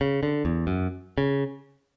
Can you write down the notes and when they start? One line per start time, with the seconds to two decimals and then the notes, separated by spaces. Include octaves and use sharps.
0.01 C#3
0.23 D3
0.45 E2
0.67 F#2
1.18 C#3